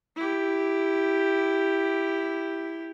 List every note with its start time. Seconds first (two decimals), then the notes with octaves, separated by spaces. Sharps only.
0.16 E4 G4